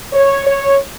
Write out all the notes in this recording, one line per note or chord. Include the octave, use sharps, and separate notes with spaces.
C#5
C#5